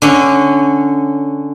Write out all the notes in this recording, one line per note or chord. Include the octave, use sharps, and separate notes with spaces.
D3 C#4